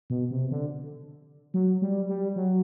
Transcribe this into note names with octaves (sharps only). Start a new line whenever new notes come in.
B2
C3
D3
F#3
G3
G3
F#3